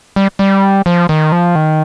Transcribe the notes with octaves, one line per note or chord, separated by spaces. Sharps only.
G3
G3
F3
D#3
F3
D#3